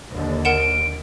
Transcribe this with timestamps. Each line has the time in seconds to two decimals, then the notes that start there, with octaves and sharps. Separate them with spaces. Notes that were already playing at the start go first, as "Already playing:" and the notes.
0.13 D#2 D3
0.45 A#4 F#5 D7 E7